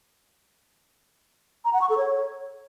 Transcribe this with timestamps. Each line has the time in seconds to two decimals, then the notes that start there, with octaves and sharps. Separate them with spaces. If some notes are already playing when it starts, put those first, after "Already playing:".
1.65 A#5
1.73 F#5
1.81 C#6
1.89 A4
1.98 C#5